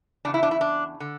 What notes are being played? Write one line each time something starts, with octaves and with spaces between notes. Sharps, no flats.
E2 C#3 D4
E4
D4
E4
D4
D3